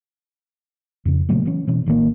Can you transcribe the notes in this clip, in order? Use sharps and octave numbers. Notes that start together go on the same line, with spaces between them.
F2 C#3
A#2 C#3 F#3 A3
E3 B3 C#4
B2 E3 C#4
A1 D#3 A3 A#3